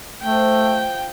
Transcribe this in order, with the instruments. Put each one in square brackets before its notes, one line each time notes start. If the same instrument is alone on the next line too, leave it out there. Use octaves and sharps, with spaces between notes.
[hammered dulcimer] C3 F3 [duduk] A3 [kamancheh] G5